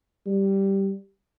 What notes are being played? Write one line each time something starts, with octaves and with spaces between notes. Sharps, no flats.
G3